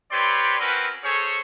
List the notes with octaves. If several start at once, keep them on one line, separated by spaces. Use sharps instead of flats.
C4 G4 B4 C#5 D5 C6
C4 C#4 F#4 A#4 B4
C#4 G#4 A4 C5 C#5